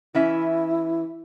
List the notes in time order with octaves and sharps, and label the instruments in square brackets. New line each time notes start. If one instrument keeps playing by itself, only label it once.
[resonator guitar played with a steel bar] E3 C#4 E5 [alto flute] E4